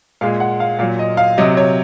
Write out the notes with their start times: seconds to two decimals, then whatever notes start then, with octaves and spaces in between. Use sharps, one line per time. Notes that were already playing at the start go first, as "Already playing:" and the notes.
0.21 A#2 G#3 F5
0.40 F#5
0.60 F5
0.79 A#2 F5
0.82 F#3
0.99 D#5
1.17 F5
1.38 C3 F#3 D#5
1.57 C#5